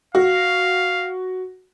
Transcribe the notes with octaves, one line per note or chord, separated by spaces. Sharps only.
F#4 F5